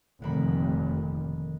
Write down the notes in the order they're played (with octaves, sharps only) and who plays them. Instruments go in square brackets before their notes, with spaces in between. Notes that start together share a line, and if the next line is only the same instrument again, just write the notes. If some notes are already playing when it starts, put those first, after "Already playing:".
[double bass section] F1 A#2 [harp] D3 D#3 B5